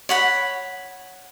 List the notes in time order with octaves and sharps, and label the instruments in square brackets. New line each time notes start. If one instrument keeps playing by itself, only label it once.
[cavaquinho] C#5 F#5 B5